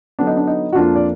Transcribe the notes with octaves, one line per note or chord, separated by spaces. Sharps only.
D3 F#3 B3 D4
D#4
D4
D#4
F#4
F2 F3 A#3 D4 F4
D5